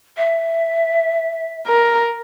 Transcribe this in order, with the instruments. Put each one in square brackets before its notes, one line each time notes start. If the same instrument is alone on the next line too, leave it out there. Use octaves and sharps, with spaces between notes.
[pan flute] E5
[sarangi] A#4